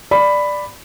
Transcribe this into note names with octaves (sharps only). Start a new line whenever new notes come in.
D5 B5